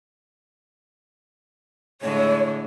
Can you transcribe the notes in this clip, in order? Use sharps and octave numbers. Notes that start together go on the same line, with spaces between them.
A2 D3 G#3 C#5